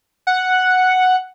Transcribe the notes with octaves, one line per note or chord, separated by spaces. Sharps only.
F#5